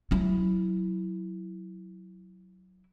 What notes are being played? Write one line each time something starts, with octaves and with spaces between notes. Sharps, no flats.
F#3 E4